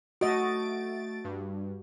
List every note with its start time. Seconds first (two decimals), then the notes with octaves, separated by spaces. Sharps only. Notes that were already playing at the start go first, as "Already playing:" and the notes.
0.21 A3 F#4 D#5 A6 D7
1.25 G2